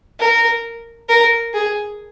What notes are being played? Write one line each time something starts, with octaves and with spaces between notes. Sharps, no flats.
A#4
A#4
G#4